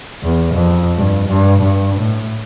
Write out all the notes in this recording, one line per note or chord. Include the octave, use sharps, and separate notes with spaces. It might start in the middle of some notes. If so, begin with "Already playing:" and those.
E2
F2
G2
G2
G2
A2